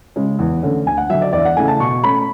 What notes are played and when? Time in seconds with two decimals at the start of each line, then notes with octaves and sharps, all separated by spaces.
0.16 C#3 G#3 C#4
0.39 E2
0.63 D3 A3 C#4
0.86 D2 G#5
0.97 F#5
1.10 D3 F#3 E5
1.22 D5
1.33 E2 D5
1.39 E5
1.45 F#5
1.57 C#3 E3 A3 G#5
1.68 A5
1.79 B2 C#6
2.03 A3 C#4 B5